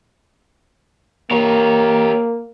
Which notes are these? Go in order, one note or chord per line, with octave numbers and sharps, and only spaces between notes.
A#3 G4 C#5